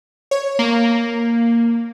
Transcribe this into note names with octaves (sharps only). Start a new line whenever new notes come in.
C#5
A#3